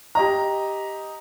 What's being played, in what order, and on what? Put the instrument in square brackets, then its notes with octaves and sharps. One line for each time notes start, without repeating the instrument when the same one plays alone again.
[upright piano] G4 D#5 A#5